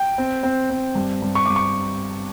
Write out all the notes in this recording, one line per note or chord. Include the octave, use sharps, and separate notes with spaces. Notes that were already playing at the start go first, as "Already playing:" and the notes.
Already playing: G5
C4
C4
C4
G2
G2
C#6
G2 D6
C#6